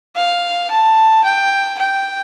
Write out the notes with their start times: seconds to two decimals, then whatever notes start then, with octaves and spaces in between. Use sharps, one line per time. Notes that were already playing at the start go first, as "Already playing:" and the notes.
0.16 F5
0.71 A5
1.24 G5
1.78 G5